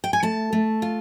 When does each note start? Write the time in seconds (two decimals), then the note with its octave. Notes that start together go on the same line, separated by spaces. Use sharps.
0.04 G5
0.13 G#5
0.23 A3 A5
0.53 A3
0.82 F4